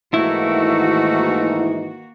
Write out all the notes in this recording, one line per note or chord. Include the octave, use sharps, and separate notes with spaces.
G#2 D#3 E3 A3 A#3 D#4 E4 F#4